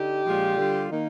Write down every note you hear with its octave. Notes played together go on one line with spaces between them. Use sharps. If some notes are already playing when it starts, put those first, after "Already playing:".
Already playing: D3 D#4 G4
A#2 F3 G#3 D4 F4
D3 G3 D4 F4
D#3 A#3 D#4